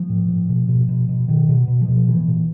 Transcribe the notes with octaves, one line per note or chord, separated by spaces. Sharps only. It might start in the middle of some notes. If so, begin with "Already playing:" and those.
Already playing: F3
A2
A2
B2
B2
B2
B2
B2 D#3
B2
B2
F3
B2
A#2 E3
A#2